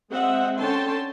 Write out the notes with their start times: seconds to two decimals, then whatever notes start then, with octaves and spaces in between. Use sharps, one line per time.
0.12 G#3 C4 D#5 E5 F#5
0.59 D3 C#4 G5 A5 C6